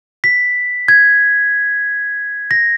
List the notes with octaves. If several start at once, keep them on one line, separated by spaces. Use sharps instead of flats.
B6
G#6
A#6